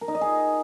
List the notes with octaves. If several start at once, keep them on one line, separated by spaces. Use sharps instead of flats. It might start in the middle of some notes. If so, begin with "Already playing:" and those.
A#4
D#4
D#5
G#4